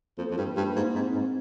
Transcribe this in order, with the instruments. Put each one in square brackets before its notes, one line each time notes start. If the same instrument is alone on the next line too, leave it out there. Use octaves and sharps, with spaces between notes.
[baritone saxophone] F2 [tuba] A#3
[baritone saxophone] F2
G2
G2
G#2
[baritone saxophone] G#2 [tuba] C4
[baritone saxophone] G#2